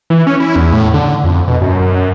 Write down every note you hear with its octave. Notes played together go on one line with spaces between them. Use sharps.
E3
C#4
E4
E2
A2
D3
F2
B2
F#2
F#2